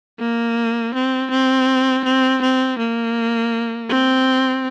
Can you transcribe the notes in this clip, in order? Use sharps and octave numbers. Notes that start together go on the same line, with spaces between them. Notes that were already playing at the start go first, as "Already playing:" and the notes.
A#3
C4
C4
C4
C4
A#3
C4